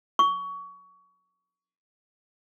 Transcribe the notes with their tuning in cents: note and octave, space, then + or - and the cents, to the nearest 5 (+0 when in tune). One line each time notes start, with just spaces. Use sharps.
C#6 +25